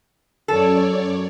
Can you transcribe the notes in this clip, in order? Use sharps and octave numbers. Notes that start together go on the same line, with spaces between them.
F#2 A4 C#5 D5